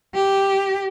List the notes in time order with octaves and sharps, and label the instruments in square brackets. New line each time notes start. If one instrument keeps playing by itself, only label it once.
[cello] G4